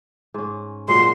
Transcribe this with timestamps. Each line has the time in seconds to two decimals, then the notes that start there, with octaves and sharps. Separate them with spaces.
0.34 G#2 C#4
0.88 A#2 F#3 G#3 C6